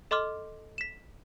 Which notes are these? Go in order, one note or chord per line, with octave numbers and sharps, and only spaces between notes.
A4 D#5 C6 D6 F6
B6 E7